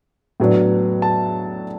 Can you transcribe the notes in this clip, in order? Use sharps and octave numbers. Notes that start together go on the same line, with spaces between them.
A2 F#3 B3 D4
A5